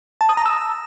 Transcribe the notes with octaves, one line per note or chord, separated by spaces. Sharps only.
A5
D#6
A#5
E6